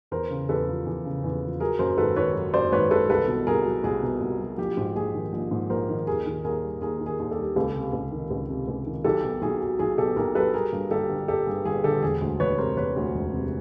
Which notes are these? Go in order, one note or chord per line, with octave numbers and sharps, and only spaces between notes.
E2 A#4 C5
C#3
E2 A4 B4
F3
E2
C#3
E2
F3
F#3 G#4 A#4
F#2 A#4 C5
G#1 A4 B4
D#3 B4 C#5
F#3
F#2 C5 D5
G#1 B4 C#5
D#3 A4 B4
C2 A4 B4
B2
C2 G#4 A#4
F#3
C2 G#4
B2
C2
F#3
A#1 G4
G#2
A#1 G#4
D#3
A#1
G#2
A#1 A#4 C5
D#3
D#2 G#4 A#4
D#3
D#2 G#4 A#4
G3
D#2 G#4 A#4
D#3
G#4 A#4
D#2
G4 A4
G3
C#2 G4 A4
C3
C#2
D#3
C#2
C3
C#2
D#3
B1 G4 A4
B2
B1 G#4
F#3
B1 G#4
B2 G4 A4
B1 G#4 A#4
F#3 A4 B4
G3 G#4 A#4
G2
G1 G4 A4
D3
G3 G4 A4
G2 G#4
G1 G#4
D3 G4 A4
E1 G#4
D2
E1 B4 C#5
C3 A#4 C5
E1 B4 C#5
D2
E1
C3